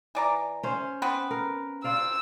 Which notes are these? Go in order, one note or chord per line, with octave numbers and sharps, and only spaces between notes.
E3 D5 A#5
C#4 C5
B3 C4 B4
A#4
C5 D5 F5 E6